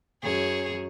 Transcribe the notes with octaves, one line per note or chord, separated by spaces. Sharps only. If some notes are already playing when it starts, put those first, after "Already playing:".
F#2 G#4 C#5